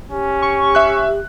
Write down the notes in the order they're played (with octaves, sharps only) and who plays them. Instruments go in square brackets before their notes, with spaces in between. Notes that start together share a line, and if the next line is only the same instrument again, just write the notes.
[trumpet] C#4 [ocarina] G4
[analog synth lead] C#6
[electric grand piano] E5 F#6